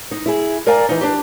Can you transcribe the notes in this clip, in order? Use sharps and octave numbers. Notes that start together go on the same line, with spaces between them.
D#4
E4 G#4
A#4 D5 F5 G#5 A#5
E3 D#4
D4 G4